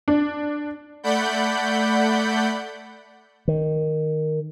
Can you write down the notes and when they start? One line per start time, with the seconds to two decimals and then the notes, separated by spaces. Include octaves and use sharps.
0.08 D4
1.03 A3 D5 F#5 B5 G6
3.48 D#3